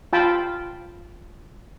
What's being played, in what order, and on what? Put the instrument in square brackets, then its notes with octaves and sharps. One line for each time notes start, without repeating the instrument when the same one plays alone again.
[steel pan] F4 G5 A5 B5